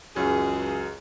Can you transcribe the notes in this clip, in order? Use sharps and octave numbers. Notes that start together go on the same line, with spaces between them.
C#2 F#2 G#4